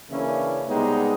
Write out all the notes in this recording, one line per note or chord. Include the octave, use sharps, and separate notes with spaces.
C#3 E3 A#3 C#4 D4 E4
C2 G#3 B3 D#4 G4